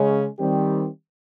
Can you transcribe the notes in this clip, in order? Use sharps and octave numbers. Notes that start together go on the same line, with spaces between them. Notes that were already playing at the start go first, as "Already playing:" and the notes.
Already playing: C#3 G#3 C#4
D#3 G3 C4 G4